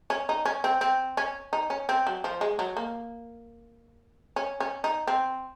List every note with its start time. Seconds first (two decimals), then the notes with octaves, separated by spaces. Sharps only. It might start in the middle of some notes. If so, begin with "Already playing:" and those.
0.10 C#4
0.29 D#4
0.45 C#4
0.64 C4
0.81 C4
1.17 C#4
1.53 D#4
1.70 C#4
1.89 C4
2.07 F#3
2.24 F3
2.41 G#3
2.59 F#3
2.77 A#3
4.36 C#4
4.60 C#4
4.84 D#4
5.07 C4